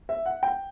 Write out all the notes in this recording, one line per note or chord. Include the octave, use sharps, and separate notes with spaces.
E5
F#5
G5